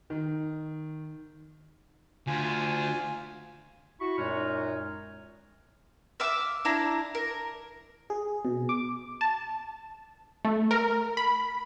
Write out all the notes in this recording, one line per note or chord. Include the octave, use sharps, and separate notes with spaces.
D#3
D2 F4 G#5
E4 F#4 B5 C#6
F#2 A#2 G#3 D#4 C#5 F6
E5 F5 D6 E6
D4 E4 A#5
A#4
G#4
B2
D6
A5
A3
A#4
B5